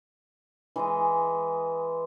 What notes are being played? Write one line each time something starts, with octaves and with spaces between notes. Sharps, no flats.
E3 G#3 D#5